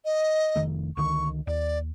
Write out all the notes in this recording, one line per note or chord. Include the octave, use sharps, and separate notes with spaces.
D#5
F1 D#3 A3
C#2 D3 D#3 C#6
D#2 D5